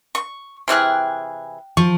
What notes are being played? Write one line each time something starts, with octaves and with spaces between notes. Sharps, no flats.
C#6
C3 E3 G#4 G5 F6 F#6
F3 C#6